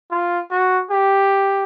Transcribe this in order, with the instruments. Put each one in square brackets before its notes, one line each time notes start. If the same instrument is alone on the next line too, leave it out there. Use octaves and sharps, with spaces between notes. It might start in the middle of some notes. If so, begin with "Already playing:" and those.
[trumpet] F4
F#4
G4